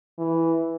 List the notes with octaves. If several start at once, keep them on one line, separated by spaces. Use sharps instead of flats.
E3